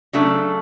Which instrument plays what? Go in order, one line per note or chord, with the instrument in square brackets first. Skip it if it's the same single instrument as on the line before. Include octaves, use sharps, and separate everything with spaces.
[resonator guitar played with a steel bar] C#3 F#3 A3 D4